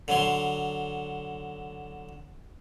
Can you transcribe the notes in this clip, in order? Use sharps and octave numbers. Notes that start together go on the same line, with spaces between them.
D3 F#3 C6